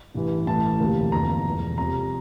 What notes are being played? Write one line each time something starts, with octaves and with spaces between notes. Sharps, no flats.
A1 G2 E3
A1 A2 E3 A3 A5
E1 D2 C3 G3 A#3
G1 F2 E3 A#3 A#5
E1 E2 E3
F1 F2 C3 A#5